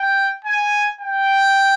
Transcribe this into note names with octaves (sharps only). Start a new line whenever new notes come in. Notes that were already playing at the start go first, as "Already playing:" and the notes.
Already playing: G5
G#5
G5